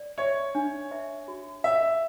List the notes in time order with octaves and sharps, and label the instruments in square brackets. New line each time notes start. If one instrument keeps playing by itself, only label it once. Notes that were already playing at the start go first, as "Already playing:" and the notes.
Already playing: [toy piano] D5
[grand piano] C#5 [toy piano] E5
[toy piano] D4
E5
F#4
[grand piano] E5 [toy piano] F#5